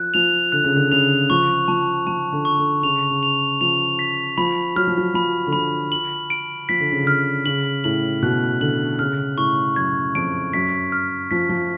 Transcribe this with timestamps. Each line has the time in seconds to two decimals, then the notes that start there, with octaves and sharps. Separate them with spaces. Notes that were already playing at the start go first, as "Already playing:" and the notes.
Already playing: F3 F#6
0.14 F3 F7
0.52 D3 F#6
0.64 C#3
0.76 D3
0.91 C#3 F7
1.30 F3 C#6
1.68 F3 A5
2.07 F3 A5
2.32 D3
2.45 C#6
2.58 D3
2.83 C#3 F7
3.10 C#3
3.23 F7
3.61 F3 F7
3.99 B6
4.38 F3 B5
4.76 F#3 F6
4.87 F3
4.98 F#3
5.14 F3 B5
5.47 D3
5.53 F3 B5
5.92 F#7
6.30 D7
6.69 F3 B6
6.80 D3
6.92 C#3
7.04 D3 F6
7.46 C#3 F#7
7.84 A2 F#7
8.22 B2 F#6
8.61 D3 F#7
8.99 C#3 F6
9.38 A2 C#6
9.76 F#2 G#6
10.15 F2 D7
10.53 F#2 B6
10.92 F6
11.31 F3 B6
11.49 F3